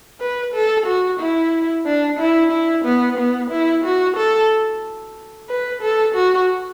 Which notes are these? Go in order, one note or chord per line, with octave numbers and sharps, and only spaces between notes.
B4
A4
F#4
E4
D4
E4
E4
B3
B3
E4
F#4
A4
B4
A4
F#4